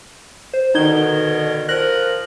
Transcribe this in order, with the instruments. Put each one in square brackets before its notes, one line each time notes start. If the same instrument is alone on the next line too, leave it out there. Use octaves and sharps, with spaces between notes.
[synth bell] C5
[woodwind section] B2 D3 D#3 [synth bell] D#4 G#6 G7
[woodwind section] F3 A#4 [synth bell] F#6 A#6 F#7